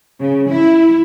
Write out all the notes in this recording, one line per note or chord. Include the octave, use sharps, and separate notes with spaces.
C#3
E4